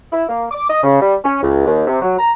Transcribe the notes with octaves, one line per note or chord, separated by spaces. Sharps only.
E4
A#3
D6
D#5
C#3
G3
C#4
C#2
D#2
C3
F#3
A#5